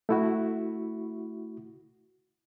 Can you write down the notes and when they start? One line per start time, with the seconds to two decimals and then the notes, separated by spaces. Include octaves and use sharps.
0.09 A3 E4 F#4